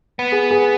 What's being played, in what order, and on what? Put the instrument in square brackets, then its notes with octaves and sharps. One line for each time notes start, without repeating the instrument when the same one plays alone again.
[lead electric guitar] B3
[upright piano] G#4
G#4